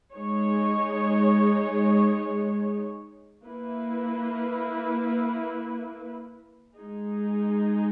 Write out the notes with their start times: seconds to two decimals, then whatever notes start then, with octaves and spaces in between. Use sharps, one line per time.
0.13 G#3 D#4 G#4 C#5
3.44 A#3 E4 B4
6.76 G#3 D#4 G#4